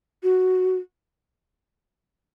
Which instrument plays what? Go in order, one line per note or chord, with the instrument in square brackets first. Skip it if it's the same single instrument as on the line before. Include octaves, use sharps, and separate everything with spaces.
[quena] F#4